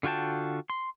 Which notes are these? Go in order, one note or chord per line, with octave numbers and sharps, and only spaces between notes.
D3 F4 F#4 G5 A5
C6